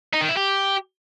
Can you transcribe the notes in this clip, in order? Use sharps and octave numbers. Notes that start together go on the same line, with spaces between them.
D#4
D#3
E4
G4